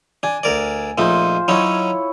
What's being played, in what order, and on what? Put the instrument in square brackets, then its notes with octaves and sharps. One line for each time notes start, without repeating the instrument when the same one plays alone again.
[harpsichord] D4 [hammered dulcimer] G#5
[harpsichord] D2 A#4 D5
[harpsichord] A#1 A3 D#4 [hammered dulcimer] F4 C5
[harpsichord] F#3 C#4 D#4 [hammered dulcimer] E4 C#5